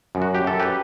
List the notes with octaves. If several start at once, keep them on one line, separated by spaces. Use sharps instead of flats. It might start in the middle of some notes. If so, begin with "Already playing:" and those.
F#2
F#4
G4
F#2 A4
G4 B4